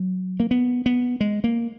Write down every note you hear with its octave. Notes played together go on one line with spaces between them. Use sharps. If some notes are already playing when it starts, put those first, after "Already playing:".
Already playing: F#3
A#3
B3
B3
G#3
A#3